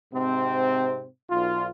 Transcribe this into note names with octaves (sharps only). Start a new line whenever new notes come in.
G#2 C3 C4
B1 F4